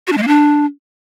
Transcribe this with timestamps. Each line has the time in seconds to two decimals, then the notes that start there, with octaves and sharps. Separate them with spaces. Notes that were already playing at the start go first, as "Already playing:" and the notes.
0.07 F#4
0.12 D4
0.17 G#3
0.22 A#3
0.27 D4